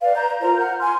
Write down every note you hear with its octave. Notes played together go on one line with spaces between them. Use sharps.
B4 D5 F5
A#5 G6
F4 A#4 C5 A#5
F#5 F6 G6
G#5 C6 F6